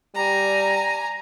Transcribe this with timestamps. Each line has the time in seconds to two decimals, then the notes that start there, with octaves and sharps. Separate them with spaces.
0.15 G3 G#5 A#5